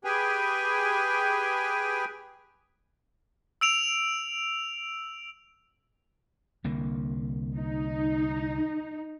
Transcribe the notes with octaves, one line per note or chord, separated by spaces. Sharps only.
G4 G#4 B4 G5 G#5
E6 D7 F7
C2 D3 A#3
D#4